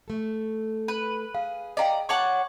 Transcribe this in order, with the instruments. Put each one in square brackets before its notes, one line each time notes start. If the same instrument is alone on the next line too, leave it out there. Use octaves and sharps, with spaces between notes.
[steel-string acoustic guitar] A3 A4
[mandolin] B4
[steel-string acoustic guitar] G#4 [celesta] F5
[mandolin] D5 A#5 [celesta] D#5 F5 G5
[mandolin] C#5 F#5 A5 [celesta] C#6 D6 F#7